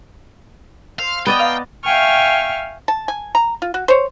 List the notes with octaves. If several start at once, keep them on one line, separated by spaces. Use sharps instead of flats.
C5 F5 E6
B3 D5 D#5 G5
F5 A#5 F6
E5 F5 G5 G#5 C#6 F6
A5
G#5
A#5
F4
F#4
C5 C#5